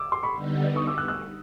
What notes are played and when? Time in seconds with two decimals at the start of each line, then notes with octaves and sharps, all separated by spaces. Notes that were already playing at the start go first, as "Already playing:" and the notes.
Already playing: D6 E6
0.12 C6 D6
0.23 B5 C#6
0.33 D3 G3 B3 D#4
0.76 C#6 D#6
0.87 D6 E6
0.98 E6 F#6
1.08 E6 F#6